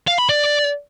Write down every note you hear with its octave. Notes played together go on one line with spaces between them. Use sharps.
F5
B5
D5